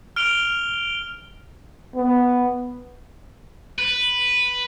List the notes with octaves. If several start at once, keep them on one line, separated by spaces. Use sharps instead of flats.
F6 D7 F7 G7
B3
B4